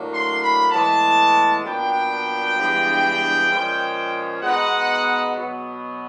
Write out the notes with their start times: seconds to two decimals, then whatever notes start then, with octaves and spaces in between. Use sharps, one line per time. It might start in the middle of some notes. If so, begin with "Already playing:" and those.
Already playing: A2 F#3 A#3 D4
0.10 C6
0.42 B5
0.71 A2 E3 G#3 B3 A5
1.64 A#2 F#3 B3 D4 G5
2.56 G2 E3 G#3 B3 D4
3.50 A#2 F3 G#3 C#4
4.41 B2 G#3 B3 D#4 F#5
5.34 B2 F#3 B3